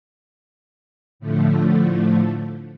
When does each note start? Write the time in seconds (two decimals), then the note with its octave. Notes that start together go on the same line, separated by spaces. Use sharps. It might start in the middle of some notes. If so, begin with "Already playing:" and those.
1.20 A2 D3 F3 A3